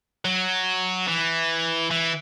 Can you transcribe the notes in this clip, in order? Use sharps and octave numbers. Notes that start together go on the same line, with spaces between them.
F#3
E3
E3